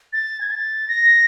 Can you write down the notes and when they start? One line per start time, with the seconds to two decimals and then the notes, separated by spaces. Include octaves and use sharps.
0.13 A6
0.41 G#6
0.51 A6
0.88 A#6